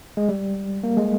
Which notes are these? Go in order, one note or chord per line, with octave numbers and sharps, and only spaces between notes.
G#3
G3
A#3
G#3